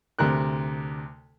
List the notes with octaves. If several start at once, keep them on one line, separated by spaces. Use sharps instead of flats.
D2 C3 A#4 F#6